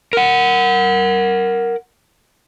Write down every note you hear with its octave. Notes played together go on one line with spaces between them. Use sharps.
A#4 F#5